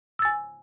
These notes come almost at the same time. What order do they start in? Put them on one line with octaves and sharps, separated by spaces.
E6 A6 G#5